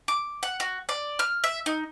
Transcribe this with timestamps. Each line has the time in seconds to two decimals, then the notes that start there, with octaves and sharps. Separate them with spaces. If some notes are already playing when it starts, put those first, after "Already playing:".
0.08 D6
0.43 F#5
0.60 F#4
0.89 D5
1.19 F6
1.44 E5
1.66 D#4